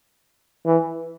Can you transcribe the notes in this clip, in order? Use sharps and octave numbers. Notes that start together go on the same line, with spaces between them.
E3